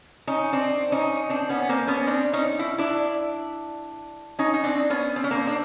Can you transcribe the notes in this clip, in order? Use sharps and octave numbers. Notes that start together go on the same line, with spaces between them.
C#4 D#4
C4 D4
C#4 D#4
C4 D4
B3 C#4
A#3 C4
B3 C#4
C4 D4
C#4 D#4
E4
D4 E4
C#4 D#4
D#4
C4 D4
B3 C#4
C4
C#4
A#3 C4
D4